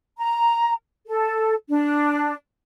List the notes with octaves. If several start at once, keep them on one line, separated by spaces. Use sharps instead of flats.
A#5
A4
D4